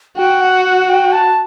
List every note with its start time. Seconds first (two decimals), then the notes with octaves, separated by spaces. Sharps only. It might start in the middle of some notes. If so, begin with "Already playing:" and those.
0.17 F#4 G5
0.41 F#5
0.65 F#5
0.89 G5
1.13 A5